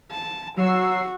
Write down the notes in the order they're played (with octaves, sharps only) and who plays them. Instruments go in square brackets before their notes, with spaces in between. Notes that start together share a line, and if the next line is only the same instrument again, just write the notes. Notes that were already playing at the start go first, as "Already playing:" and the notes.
[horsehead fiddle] A5
[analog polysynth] F#3 E6 C7 [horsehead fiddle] F#4